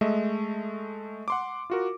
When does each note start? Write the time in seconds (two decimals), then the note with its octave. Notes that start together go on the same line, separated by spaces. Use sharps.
0.01 G#3 A3 D#5 E5
1.28 F#5 C6 D6
1.70 F4 F#4 A#4